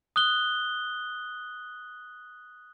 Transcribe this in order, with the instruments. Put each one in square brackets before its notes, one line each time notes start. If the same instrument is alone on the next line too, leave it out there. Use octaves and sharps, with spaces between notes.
[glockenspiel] D#6 F#6 G7